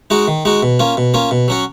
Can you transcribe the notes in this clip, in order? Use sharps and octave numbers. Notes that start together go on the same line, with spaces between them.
G#3 D#4 F#4
D#3
G#3 D#4 F#4
B2
A#3 C#4 F4
B2
A#3 C#4 F4
B2
F#3 C#4 F#4